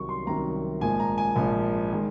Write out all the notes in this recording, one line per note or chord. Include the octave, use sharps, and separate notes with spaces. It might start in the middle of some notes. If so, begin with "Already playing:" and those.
Already playing: C2 C3 D#3 F#3 C#6
C6
C2 C3 D#3 F#3 A#5
A#1 G#2 F3 A#3 G#5
A#5
G#5
A#1 G#2 F3 A#3
D#3 G#3